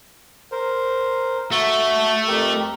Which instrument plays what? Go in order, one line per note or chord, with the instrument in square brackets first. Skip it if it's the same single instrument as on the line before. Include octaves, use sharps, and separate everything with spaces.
[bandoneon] A#4 C5
[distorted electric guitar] A3 [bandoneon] F#4
[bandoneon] F2 G4 A#4